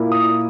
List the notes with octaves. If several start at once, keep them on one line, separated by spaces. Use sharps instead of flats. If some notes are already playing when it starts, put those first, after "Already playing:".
Already playing: A#2 A#3 E4
D#6